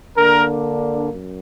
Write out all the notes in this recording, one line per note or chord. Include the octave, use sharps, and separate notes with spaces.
D3 A#3 D4 A#4
F#2